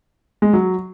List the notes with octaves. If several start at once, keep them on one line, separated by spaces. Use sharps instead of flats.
G#3
F#3